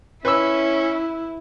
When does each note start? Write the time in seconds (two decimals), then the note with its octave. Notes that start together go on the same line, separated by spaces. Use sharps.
0.25 C#4 E4 B4 E6